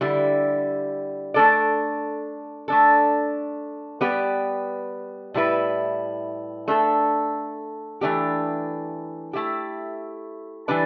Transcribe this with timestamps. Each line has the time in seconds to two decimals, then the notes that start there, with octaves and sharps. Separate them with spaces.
0.01 D3 G3 E4 G4
1.34 A3 D4 A4 D5
2.68 A3 D4 A4
4.01 G3 B3 G4 B4
5.34 A2 G3 E4 B4
6.68 A3 D4 A4
8.01 E3 A3 D4 G4
9.33 A3 E4 G4
10.68 E3 G3 D4 B4 D5